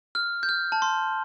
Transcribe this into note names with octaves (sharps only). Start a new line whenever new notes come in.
F6
G6
F6
A5
C6